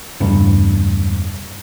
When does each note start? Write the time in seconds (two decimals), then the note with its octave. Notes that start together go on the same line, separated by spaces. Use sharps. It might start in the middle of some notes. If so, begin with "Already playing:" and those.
0.20 E1 G2